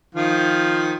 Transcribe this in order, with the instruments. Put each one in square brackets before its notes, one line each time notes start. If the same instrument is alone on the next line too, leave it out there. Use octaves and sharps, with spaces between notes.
[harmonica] D#3 F3 F4